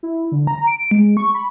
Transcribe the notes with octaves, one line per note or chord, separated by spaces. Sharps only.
E4
D3
A#5
D7
G#3
C#6
B5